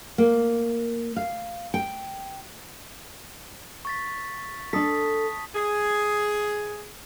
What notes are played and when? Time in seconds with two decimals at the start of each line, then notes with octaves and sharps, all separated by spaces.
0.18 A#3
1.16 F5
1.74 G5
3.85 C#6 A6 B6
4.73 D4 A4 A5 D#6 B6
5.54 G#4